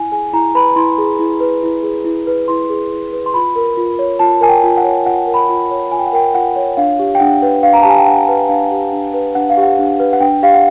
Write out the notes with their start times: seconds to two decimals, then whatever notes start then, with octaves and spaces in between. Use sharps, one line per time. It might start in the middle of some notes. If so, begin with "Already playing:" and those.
Already playing: E4 G#5
0.12 G#4 G#5
0.33 E4 A#5
0.55 B4 B5
0.76 E4 C6
0.98 G#4
1.19 E4
1.40 B4
1.63 E4
1.83 G#4
2.05 E4
2.27 B4
2.48 E4 C6
2.70 G#4
2.91 E4
3.13 B4
3.26 C6
3.34 F4 B5
3.56 A#4
3.77 F4
3.99 C#5
4.19 F4 A5
4.41 A#4 G#5
4.49 G5
4.64 F4
4.77 F#5
4.84 C#5
5.06 F4 F#5
5.27 A#4
5.34 B5
5.49 F4
5.71 C#5
5.92 F4 G#5
5.99 G5
6.06 F#5
6.13 A#4 G5
6.35 F4 F#5
6.56 C#5
6.77 D4 F5
6.99 G4
7.15 G5
7.20 D4 F#5
7.42 B4
7.63 D4 F5
7.73 A#5
7.82 G4 A5
7.90 G#5
7.98 G5
8.06 D4 F#5
8.28 B4
8.49 D4 F5
8.71 G4
8.92 D4
9.14 B4
9.35 D4 F#5
9.50 F5
9.57 G4
9.63 F#5
9.79 D4
10.00 B4
10.13 F#5
10.21 D4 G5
10.43 G4 F5
10.54 F#5